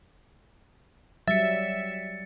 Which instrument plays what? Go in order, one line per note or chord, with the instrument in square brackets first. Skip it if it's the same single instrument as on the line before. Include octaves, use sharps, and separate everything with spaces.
[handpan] F#3 G3 [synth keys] E5 [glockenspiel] A6 C#7